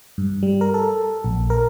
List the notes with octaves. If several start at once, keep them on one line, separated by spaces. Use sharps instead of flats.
G2
G3
A#4
A4
A#1
A#4